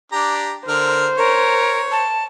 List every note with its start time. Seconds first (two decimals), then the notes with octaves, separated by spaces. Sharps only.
0.12 D4 G4 A#5
0.68 D3 A#4 C5 F6
1.18 A#4 C#5
1.92 A5